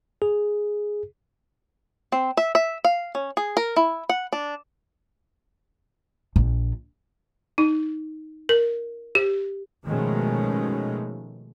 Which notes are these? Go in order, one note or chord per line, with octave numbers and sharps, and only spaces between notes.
G#4
C4
E5
E5
F5
C#4
G#4
A#4
E4
F#5
D4
A#1
D#4
A#4
G4
B2 D#3 F3 G#3 A3 C#4